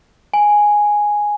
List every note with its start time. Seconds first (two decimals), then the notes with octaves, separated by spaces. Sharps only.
0.34 G#5